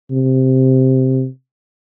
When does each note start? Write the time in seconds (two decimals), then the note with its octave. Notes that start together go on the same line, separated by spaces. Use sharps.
0.10 C3